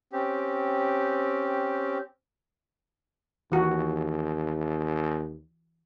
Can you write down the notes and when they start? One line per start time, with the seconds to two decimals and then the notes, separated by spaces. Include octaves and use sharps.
0.13 C4 C#4 G4
3.52 D#2 E3 F#4